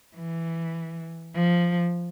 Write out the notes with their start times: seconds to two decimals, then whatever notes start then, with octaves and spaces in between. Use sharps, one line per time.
0.17 E3
1.35 F3